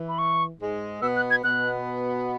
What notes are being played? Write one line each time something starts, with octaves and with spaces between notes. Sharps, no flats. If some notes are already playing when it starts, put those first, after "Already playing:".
Already playing: E3
B5
C#6
G#2 G#3
B2 B3 E6
F#6
G#6
B2 B3 F#6